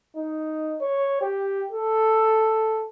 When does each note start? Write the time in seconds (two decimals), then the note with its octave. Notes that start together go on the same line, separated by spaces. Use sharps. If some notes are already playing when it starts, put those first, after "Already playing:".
0.17 D#4
0.81 C#5
1.22 G4
1.71 A4